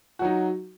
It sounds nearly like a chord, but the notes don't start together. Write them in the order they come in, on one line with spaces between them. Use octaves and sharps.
F#4 F#3 D#4